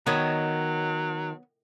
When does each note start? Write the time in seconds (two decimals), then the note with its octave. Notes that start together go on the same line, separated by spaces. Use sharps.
0.07 D#3 F#3 B3 C#5 D#5